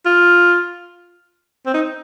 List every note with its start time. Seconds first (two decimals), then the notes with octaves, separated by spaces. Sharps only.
0.05 F4
1.66 C4
1.74 D#4